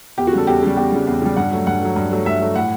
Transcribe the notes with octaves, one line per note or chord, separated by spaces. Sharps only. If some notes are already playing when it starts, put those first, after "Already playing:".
E2 G4
F#4
C#3 G3 A4
E2 G4
C#3 G3
E2 G4
C#3 G3
E2
C#3 G3
G2 F#5
F#3 A3
G2 F#5
F#3 A3
G2
F#3 A3
G2 E5
F#3 A3
A2 F#5